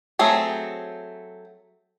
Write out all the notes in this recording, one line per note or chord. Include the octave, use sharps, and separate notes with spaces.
F#3 A3 C4 G#4